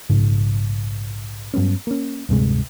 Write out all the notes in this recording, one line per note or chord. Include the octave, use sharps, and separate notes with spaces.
A#1 G#2 C#3
G2 F#3 B3 C#4
A#3 C#4
D1 G2 C3 G#3